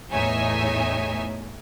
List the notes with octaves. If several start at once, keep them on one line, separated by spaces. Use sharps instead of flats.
E2 A2 D#4 C#5 E5 G#5